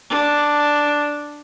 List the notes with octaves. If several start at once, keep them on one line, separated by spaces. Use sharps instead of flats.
D4